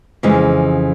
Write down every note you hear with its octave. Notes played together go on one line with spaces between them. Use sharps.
F2 C#3 E3 G#3